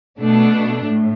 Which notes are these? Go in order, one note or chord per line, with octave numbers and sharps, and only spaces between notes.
B2 A3 D4
A2